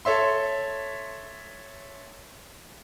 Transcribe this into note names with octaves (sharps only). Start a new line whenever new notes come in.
A4 C#5 E5 C6